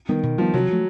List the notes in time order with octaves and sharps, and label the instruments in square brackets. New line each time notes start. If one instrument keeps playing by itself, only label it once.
[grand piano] D#3 [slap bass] G3 B3
[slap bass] B2
[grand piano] F3 [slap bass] G3
[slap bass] B3
[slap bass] C3 [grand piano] F#3
[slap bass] F3 A3